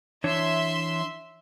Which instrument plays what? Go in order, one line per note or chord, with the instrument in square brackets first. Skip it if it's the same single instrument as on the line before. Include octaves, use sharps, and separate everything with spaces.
[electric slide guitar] E3 D4 C#5 [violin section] E5 C6